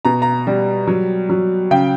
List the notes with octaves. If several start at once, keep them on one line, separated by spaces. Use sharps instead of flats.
B2 A#5
A#5
G3
F#3
F#3
C#3 G5